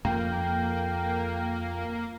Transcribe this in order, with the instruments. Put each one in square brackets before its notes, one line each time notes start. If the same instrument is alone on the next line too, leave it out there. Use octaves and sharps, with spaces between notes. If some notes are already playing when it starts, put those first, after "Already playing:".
[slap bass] F2 [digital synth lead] A#3 [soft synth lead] G5